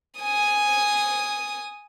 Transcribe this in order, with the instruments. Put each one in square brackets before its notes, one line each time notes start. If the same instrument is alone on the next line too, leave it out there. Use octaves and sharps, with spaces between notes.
[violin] G#5 D#6